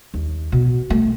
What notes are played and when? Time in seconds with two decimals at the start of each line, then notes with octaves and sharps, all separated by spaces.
0.14 D#2
0.52 B2
0.90 A3